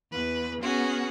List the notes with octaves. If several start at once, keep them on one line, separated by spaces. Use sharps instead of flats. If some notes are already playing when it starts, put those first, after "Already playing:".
E2 B4
B3 C#4 F#4 G#4